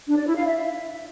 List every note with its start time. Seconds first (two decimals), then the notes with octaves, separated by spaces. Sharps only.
0.07 D4
0.17 D5
0.26 E4
0.36 F5
0.45 E5